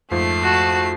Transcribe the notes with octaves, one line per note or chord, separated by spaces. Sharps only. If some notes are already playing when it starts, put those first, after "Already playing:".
F2 G#2 F3 A3 C7
F#4 A5